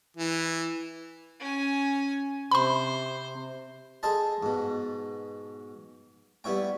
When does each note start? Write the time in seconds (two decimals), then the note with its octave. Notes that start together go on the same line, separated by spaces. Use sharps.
0.17 E3
1.40 C#4 G#5
2.51 C3 C5 B5 C6
4.03 G#4 A4 C5 D#5 A5
4.43 G#2 B2
6.44 G3 B3 E4 C#5 G5